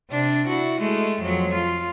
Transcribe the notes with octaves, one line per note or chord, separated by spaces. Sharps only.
C3 D4
E4 F#4
G#3 A3
F2 F#3
F4